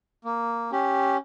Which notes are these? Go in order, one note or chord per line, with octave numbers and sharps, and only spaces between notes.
A#3
C#4 G4